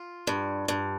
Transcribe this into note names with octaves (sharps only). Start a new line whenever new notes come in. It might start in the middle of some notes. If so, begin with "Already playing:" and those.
Already playing: F4
G2
G2